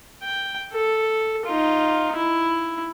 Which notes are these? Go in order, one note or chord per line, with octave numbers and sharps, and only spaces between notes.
G5
A4
D#4 F4
E4